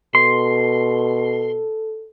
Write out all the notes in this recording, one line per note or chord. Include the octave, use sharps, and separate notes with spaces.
B2 A4 C6